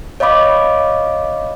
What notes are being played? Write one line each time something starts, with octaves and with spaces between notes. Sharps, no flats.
C#5 D#5 F5 B5 D6